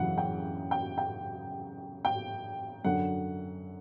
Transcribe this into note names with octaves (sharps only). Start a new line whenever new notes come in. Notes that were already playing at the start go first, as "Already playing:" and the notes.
Already playing: F#2 C#3 E3 F#5
G5
G5
G5
G5
F#2 D3 F#5